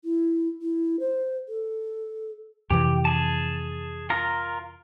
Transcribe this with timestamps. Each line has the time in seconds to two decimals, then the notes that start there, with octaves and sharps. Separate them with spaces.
0.04 E4
0.62 E4
1.00 C5
1.49 A4
2.70 F2 C3 E3 G4
3.05 G#4 A5
4.10 F4 A#4 A#5